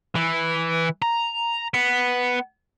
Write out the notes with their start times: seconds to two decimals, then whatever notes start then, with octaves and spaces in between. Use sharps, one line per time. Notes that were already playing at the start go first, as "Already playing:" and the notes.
0.16 E3
1.02 A#5
1.74 B3